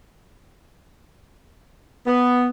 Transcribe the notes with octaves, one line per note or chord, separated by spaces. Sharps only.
B3